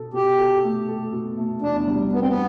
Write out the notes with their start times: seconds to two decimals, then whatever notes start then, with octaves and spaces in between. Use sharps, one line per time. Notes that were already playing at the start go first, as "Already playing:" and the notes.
Already playing: B2 A4
0.13 B2 G4
0.38 A4
0.63 A3
0.88 A4
1.12 B2
1.37 A3
1.62 E2 D4
1.87 G3
2.12 B3 D4
2.20 C4
2.27 B3